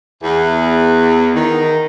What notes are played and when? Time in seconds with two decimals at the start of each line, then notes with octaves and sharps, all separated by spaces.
0.24 E2
1.35 D#3